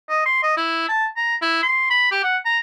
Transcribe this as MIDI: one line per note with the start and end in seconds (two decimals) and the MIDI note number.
0.09 0.25 75
0.26 0.43 84
0.43 0.55 75
0.57 0.87 64
0.89 1.06 81
1.17 1.35 82
1.42 1.60 64
1.63 1.86 84
1.90 2.09 83
2.12 2.22 67
2.24 2.37 78
2.45 2.59 82